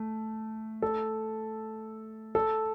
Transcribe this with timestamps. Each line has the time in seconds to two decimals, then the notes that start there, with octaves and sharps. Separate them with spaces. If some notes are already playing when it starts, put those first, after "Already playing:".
Already playing: A3
0.82 A4
2.35 A4